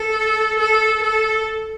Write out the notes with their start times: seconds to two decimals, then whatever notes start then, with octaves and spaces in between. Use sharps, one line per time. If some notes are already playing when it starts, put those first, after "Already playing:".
Already playing: A4
0.59 A4
1.03 A4